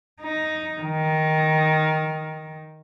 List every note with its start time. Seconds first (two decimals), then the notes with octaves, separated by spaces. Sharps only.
0.21 D#4
0.81 D#3